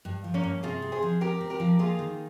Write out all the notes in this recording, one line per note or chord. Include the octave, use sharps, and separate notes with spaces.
G2
F3
A#3 C#4
G2
C3 F4 G#4
C4
G#4 C5
F3
C4 G4 A#4
C4
G4 A#4
F3
A#3 F4 G#4
D#3